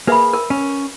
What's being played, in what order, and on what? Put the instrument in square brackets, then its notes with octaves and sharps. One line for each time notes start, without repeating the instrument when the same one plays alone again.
[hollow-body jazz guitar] A#3 G#4 [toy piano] B4 E5 B5
[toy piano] A#4
[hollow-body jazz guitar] C#4